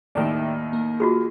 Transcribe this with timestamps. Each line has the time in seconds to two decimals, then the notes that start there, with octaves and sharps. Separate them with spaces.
0.15 D#2 A2 D#3 D5 E5 G5
0.73 A#3
1.00 F4 F#4 G#4